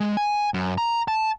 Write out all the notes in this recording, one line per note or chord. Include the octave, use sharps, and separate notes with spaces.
G#3
G#5
F#2
A#5
A5